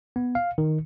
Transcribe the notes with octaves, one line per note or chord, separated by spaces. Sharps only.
B3
F5
D#3